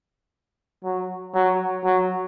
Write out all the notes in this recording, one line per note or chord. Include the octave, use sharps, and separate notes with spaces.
F#3
F#3
F#3